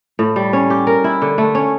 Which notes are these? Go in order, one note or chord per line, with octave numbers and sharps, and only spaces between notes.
A2
G3
C#4
G4
A#4
E4
D3
A3
C#4